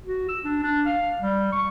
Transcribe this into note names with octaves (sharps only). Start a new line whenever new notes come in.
F#4
E6
D4
D4
F5
G3
C#6